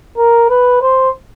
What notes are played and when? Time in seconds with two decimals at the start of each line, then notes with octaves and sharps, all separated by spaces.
0.17 A#4
0.50 B4
0.82 C5